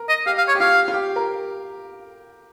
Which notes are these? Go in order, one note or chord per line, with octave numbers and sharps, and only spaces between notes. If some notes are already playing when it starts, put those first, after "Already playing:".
Already playing: A#4
D#5
G4 F5
F5
C#5
G4
F4 F5
F4
G4
A#4